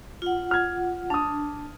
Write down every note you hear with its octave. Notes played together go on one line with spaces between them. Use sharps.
F4 F#5
F6 G#6
D4 A5 D#6